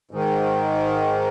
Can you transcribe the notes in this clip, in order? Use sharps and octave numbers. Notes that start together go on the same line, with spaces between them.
G#2 D#3